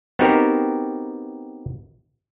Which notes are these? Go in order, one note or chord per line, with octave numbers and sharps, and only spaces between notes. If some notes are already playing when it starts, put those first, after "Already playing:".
B3 C4 D#4 F#4 G4 A#4